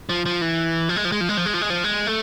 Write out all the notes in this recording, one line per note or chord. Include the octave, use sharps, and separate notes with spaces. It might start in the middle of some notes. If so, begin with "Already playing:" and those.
F3
F3
E3
F3
G#3
F3
G#3
F3
G#3
F3
G#3
F3
G#3
F3
G#3
A3